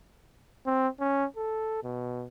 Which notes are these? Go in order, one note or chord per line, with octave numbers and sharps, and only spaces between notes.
C4
C#4
A4
B2